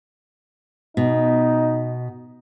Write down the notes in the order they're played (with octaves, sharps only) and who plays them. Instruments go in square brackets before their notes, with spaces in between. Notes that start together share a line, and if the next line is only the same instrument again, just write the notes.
[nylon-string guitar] B2 [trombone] D#4